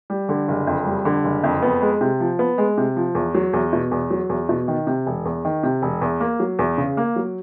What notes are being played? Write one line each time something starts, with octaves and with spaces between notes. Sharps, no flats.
G3
D3
F#1
F2
G3
D3
F#1
F2
B3
G#3
C3
F3
B3
G#3
C3
F3
E2
F#3
E2
B2
E2
F#3
E2
B2
D#3
C3
E1
E2
D#3
C3
E1
E2
A#3
F#3
E2
C#3
A#3
F#3